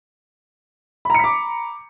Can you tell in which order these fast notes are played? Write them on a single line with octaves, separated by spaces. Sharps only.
B5 A#5 C#7 B6 D6